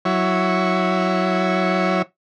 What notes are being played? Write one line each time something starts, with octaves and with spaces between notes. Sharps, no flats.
F#3 E4 C#5